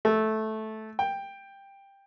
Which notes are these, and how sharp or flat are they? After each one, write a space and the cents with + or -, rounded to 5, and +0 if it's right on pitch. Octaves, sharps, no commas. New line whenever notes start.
A3 -10
G5 +10